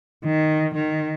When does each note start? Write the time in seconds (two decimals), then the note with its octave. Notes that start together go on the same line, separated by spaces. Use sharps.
0.24 D#3
0.75 D#3